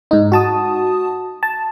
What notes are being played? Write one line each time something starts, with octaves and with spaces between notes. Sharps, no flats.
G#2 D#4
F#4 A5 D#6
A5